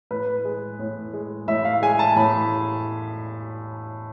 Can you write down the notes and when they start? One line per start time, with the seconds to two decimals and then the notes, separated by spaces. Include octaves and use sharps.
0.11 A2 B4
0.45 G#3
0.80 A2
1.13 G#3
1.48 A2 E5
1.65 F5
1.82 G#3 G#5
1.99 A5
2.16 A2 B5